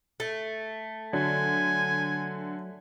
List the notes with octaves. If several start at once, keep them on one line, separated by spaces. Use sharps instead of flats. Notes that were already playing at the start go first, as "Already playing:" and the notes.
A3
D3 F#3 G#5